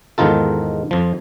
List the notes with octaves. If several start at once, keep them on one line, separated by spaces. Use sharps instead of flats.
E2 G#2 D#3 D#4 F4 A4
F2 F3